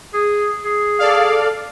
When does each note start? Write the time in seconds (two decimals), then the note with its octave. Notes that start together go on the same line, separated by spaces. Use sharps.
0.14 G#4
0.64 G#4
0.99 A4 D5 F5